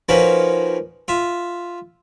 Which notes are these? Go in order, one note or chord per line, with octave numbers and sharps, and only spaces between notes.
F3 A#3 C#4 D#4 F#4 B4
F4 E5